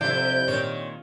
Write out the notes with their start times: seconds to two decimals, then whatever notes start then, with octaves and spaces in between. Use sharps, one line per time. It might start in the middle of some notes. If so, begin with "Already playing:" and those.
0.01 F2 C3 E4 D5 G6
0.48 A#2 D#3 C#5